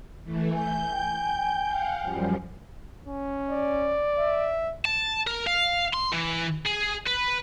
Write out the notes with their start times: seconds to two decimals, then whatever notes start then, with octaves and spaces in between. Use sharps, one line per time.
0.24 E3 A3
0.53 G#5 G6
0.90 G5
1.68 F5 F#5
2.02 F#2 F3 G3
3.07 C#4
3.50 D5
4.19 E5
4.85 A5
5.27 A#4
5.47 F5
5.94 C6
6.13 E3
6.66 G#4
7.07 B4